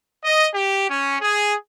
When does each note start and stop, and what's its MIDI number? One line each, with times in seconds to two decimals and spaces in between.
0.25 0.49 75
0.54 0.87 67
0.90 1.16 61
1.21 1.55 68